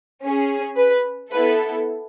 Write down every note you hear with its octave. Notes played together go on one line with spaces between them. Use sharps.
C#4 G#4
B4
B3 E4 A4 B4